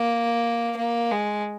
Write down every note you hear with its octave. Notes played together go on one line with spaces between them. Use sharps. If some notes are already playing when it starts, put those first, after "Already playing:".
Already playing: A#3
A#3
G#3